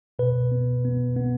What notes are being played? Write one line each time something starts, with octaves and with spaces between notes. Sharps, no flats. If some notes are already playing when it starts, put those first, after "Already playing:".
B2 B4
B3
B3
B3